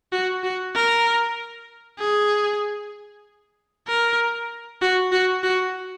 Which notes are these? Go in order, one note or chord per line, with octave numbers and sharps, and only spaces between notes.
F#4
F#4
A#4
G#4
A#4
F#4
F#4
F#4